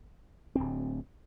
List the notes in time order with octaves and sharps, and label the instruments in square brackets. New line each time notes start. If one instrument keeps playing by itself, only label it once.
[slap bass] D1 D2 C4